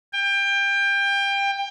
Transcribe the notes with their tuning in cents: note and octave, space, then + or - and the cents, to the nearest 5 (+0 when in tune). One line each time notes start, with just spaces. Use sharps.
G5 +25